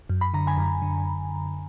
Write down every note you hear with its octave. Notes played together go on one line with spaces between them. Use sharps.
F#2
B5
D3 A#5
G#5 B5
F#2
D3